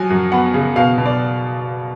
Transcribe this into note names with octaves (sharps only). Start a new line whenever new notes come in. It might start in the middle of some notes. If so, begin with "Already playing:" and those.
Already playing: F3 F#3 G#5
F#2
B3 F#5
C#3
B2 F5
B2
D5